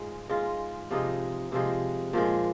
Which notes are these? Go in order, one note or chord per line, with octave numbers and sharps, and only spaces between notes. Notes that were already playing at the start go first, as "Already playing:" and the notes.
Already playing: G#2 G#3 F4
G#2 G#3 F4
C3 F3 G#3 D#4
C3 F3 G#3 D#4
A#2 F3 G#3